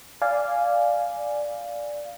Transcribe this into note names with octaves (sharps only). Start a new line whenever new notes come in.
D5 F5 G#5